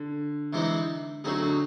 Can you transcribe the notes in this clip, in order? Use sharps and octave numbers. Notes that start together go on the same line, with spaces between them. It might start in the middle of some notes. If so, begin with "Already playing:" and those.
Already playing: D3
C3 E3 G#3 C4 D#4
D3 F#3 A3 C4 D#4 G#4
D3